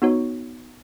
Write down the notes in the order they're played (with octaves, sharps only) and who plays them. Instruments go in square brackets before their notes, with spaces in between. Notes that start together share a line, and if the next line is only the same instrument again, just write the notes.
[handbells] B3 D#4 F#4 C#5